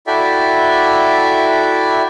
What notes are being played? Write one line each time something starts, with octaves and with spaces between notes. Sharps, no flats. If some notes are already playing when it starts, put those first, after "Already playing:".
E4 F#4 A4 D5 E5 G5